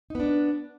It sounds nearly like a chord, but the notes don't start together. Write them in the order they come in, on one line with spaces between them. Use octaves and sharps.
D#4 B3 D4